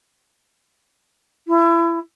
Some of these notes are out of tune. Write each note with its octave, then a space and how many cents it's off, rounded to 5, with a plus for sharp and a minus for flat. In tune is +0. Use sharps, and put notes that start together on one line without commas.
E4 +30